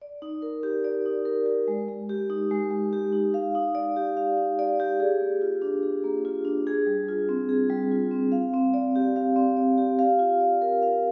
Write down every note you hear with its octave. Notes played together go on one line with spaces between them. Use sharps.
D5
D#4
A#4
G4
D5
D#4
A#4
G4
G#3
G#3
G4
D#4
G#3
G#3
G4
D#4
F5
D#4
D5
G4
F5
D#4
D5
G4
G#4
A#3
F4
D4
G#4
A#3
F4
D4
G#4
G3
F4
C4
G#4
G3
F4
C4
F5
C4
D5
G4
F5
C4
D5
G4
F5
F4
D5
A#4
F5